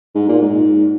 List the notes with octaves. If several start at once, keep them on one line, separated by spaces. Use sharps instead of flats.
G#2
A#2
G#2